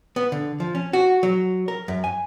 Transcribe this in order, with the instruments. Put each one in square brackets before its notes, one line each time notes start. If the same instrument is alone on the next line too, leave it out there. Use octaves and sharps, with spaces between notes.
[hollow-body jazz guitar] B3
D3
F3
C#4
F#4
F#3
A#4
F#2
G#5